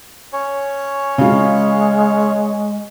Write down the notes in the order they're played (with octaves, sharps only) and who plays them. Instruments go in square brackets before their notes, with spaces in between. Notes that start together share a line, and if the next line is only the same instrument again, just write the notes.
[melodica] C#4 C#5
[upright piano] C#3 F4 [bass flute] G#3